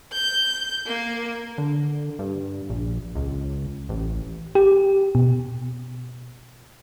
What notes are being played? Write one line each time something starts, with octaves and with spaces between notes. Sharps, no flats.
G6
A#3
D3
G2
A#1
C#2
A1
G4
B2